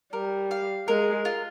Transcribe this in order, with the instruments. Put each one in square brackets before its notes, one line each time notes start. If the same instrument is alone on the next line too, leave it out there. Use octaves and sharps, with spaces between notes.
[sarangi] G3 [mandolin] A#4
[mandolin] F5
[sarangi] G#3 [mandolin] A#4
[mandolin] F4